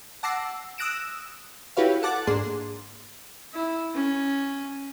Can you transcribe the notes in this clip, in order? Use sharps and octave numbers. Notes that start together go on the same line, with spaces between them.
F#5 A5 D6 E6 A#6 C7
D#6 E6 F#6 A#6 D7 E7
E4 F#4 G4 B4 C#5 F5
A4 F#5 A5 D6 F#6 A6
G#2 A#3 D4 G#4 C6
E4
C#4